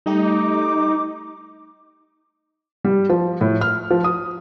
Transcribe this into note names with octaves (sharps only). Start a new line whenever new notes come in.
G3 A3 D#4 G4
D6
G3
F3
A2
F6
F3
D#6